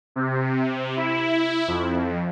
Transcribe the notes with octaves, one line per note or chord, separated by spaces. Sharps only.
C3
E4
F2